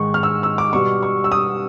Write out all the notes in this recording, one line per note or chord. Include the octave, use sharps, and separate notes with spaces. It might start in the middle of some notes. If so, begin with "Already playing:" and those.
Already playing: G#2 D#3 G#3 C#6
F6
E6
E6
D6
B2 G3 B3 C#6
C#6
E6
D#6